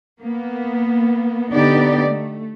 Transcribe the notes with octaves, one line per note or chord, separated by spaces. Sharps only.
A#3 B3
D3 B3 D#4 G4 D5
A3